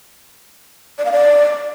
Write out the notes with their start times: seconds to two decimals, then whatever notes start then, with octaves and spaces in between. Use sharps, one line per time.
0.98 D5
1.05 F5
1.12 D5